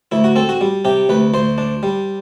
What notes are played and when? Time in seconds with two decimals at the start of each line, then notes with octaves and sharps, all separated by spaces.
0.12 D2 E4
0.24 F#4
0.36 C4 A4
0.49 F#4
0.61 G3
0.85 C3 G4
1.09 D2 B4
1.34 D2 C5
1.58 D4
1.83 G3